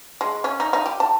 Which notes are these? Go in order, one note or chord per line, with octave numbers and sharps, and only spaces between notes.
G#3
C#4
D#4
D#4
G4
A5